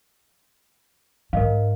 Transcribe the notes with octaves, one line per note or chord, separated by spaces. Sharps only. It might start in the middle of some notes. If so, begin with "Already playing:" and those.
G#2 A#4 D#5 F5